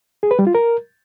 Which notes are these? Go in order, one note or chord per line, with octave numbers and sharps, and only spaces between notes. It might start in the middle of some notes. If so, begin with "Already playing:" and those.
G#4
B4
G3
F4
A#4